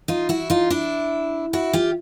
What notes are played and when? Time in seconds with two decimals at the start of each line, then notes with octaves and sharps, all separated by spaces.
0.08 D#4 F4
0.29 E4 F#4
0.50 D#4 F4
0.70 D4 E4
1.53 E4 F#4
1.73 F4 G4